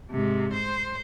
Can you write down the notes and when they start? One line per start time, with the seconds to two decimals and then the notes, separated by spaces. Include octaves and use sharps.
0.11 G#2 C3
0.53 C5